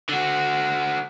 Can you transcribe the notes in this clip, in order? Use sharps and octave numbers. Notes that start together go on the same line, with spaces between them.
D3 F#4